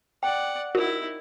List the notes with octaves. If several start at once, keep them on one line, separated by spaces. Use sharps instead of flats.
D5 F#5 G5
D#4 E4 F#4 A#4